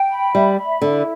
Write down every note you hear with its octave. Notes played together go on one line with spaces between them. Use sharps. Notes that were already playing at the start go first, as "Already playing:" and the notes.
Already playing: G5
B5
G3 E5
B5
D3 E4